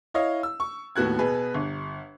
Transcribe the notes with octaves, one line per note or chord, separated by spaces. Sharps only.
E4 C#5 D#5 F5
E6
C#6
D#2 A2 B3 F#4 F#6 G#6
B2 B3 G#4 B4
G1